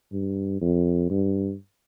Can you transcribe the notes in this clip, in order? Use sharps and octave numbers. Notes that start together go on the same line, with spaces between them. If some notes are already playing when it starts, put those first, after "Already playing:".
G2
F2
G2